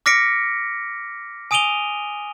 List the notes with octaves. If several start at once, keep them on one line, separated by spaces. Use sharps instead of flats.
D6 F6 A#6 B6 C#7 D7
G#5 D#6 D7 D#7 F7 G7